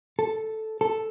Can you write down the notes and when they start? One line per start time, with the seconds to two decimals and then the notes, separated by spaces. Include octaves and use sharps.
0.19 A4
0.81 A4